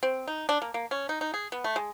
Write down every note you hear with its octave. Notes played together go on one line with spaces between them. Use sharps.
C4
D#4
D4
A#3
A#3
C#4
D#4
D#4
G#4
B3
A3
G#3